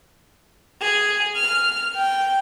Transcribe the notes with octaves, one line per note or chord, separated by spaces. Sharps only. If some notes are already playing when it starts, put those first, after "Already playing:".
G#4
F6
G5